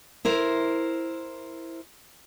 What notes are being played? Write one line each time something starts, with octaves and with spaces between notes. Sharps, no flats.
E4 A#4 C5